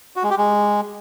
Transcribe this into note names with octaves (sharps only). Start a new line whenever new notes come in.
F#4
G#3
G4
G#3